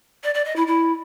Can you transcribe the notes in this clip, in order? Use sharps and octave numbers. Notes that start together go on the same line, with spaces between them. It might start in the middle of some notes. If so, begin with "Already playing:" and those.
D5
D5
D#5
E4
E4